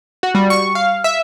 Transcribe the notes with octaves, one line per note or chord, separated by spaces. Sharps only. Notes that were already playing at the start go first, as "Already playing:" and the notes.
F#4
G3
C#6
F5
E5